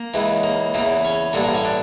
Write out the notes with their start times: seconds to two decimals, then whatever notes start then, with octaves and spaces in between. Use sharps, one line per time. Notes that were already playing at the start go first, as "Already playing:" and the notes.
Already playing: A#3
0.14 C#2 C#3 E3
0.43 A#3
0.74 E2 C#3 E3 A#3
1.05 C#4
1.33 A1 G2 D3 A#3
1.44 A#3
1.54 C#4
1.64 D4